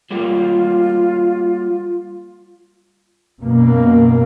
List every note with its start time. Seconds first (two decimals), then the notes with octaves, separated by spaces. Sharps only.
0.11 F#3 G3 A#3 F4
3.42 F#2 B2 A#3